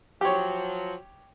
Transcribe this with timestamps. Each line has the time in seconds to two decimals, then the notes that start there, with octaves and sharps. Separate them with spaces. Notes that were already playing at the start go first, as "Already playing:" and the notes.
0.21 F3 F#3 G4 C#5